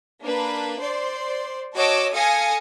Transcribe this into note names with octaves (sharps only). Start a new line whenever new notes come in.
A#3 D4 B4
C5 D5 C6
F#4 C#5 D#5 A5 D6 E6
A4 F5 G#5 D#6 A#6 C#7